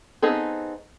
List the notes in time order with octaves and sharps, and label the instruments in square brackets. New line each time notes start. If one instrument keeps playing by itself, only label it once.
[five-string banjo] B3 C4 D#4 G#4 A4